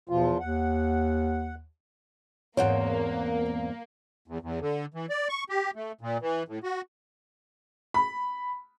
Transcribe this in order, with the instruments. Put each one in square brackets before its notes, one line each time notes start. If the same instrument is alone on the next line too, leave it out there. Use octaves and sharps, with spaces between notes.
[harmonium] E2 F3 F4 [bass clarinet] B2
[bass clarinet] D#2 [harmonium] F#5
[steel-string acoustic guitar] E2 G#2 C4 [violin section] A#3 [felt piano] C#5 F#5
[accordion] E2
E2
D3
E3
D5
C#6
G4
A3
A#2
E3
A2
F#4
[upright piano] B5